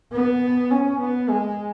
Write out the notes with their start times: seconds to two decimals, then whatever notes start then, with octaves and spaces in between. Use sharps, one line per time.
0.12 B3
0.71 C#4
1.00 B3
1.29 G#3